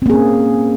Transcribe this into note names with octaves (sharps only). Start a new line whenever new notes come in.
A#3 C4 C#4 G#4